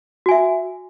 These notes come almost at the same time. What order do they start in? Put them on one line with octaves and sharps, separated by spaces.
F#4 G#5 E5